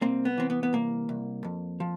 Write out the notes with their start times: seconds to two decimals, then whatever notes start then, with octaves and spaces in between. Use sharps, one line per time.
0.01 C2 A#3 C4
0.25 B3
0.38 E3 C4
0.50 B3
0.63 B3
0.73 C2 A#3
1.09 C2
1.45 F2
1.80 F3